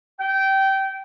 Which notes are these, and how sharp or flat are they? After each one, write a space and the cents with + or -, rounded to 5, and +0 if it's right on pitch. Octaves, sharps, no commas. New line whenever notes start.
G5 -20